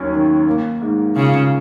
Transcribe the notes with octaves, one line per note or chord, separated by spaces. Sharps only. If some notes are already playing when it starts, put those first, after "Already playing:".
Already playing: D#2 F#3 C#4
D#3
A#3
G#2
C#3 F4